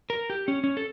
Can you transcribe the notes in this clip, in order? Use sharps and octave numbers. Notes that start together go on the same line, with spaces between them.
A#4
G4
C#4
C#4
A4